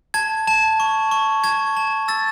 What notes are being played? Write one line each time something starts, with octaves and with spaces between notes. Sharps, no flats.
A5 G#6
A5
C#6
C#6
A5 G#6
A5
E6 A6